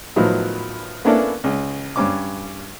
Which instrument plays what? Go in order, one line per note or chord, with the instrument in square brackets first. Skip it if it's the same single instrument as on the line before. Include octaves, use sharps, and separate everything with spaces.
[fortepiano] A2 D#3 F3 F#3 B3 D#4
A#3 B3 C#4 D4 E4 A4
C#2
G2 C#4 D6